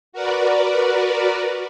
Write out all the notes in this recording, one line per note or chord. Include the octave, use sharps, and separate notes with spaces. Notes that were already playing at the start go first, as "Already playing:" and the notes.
F#4 A#4 B4 D5